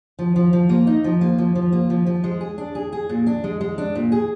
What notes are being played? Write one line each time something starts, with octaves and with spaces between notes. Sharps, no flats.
F3
F3
F3
A#3
D#4
F3
A#3
F3
F3
A#3
F3
F3
G#3
G#4
D4
G#4
G#4
A#2
D4
G#3
G#3
D4
A#2
G#4